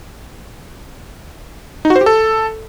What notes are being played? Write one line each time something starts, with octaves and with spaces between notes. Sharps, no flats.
D#4
F#4
C5
G4
A4